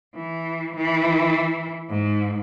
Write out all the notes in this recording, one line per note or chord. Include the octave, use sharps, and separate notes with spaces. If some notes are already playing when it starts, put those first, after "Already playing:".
E3
E3
G#2